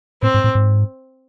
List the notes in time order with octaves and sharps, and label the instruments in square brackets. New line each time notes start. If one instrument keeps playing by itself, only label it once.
[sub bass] A2 [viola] C4
[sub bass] G#2
A2
G#2